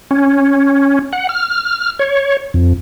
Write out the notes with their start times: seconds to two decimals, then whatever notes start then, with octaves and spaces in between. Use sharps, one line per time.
0.11 C#4
1.13 F#5
1.29 F6
1.99 C#5
2.54 F2